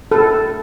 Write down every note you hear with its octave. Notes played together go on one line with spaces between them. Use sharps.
A4